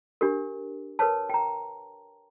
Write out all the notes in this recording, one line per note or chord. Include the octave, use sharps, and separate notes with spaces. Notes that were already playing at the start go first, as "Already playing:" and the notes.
D4 G4 A#4
A#4 B4 C#5 A5
G5 A#5